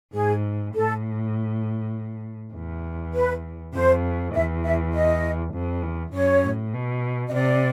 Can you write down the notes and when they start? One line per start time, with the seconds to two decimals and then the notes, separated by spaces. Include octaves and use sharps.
0.13 G#2 G#4
0.74 A2 A4
2.53 E2
3.14 B4
3.74 F2 C5
4.34 E2 E5
4.64 E5
4.94 D#5
5.54 F2
5.83 E2
6.13 F#2 C#5
6.44 A2
6.74 B2
7.29 D#5
7.34 C3 D5